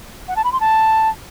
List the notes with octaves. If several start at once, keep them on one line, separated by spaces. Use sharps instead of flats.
F#5
A5
B5
C6
A5